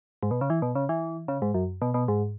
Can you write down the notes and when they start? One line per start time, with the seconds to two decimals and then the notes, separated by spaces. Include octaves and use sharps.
0.23 G#2
0.31 B2
0.41 C#3
0.50 E3
0.62 B2
0.75 C#3
0.89 E3
1.28 C#3
1.42 G#2
1.54 F#2
1.82 B2
1.94 B2
2.08 G#2